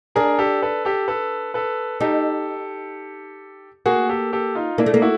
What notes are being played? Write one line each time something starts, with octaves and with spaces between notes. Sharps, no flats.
D4 G#4 A#4
G4 A4
A4 B4
G4 A4
A4 B4
A4 B4
D#4 G4 A4
A#3 F#4 G#4
G4 A4
G4 A4
D#4 F4
A#3 D4 E4
A3
A#3
E4 F#4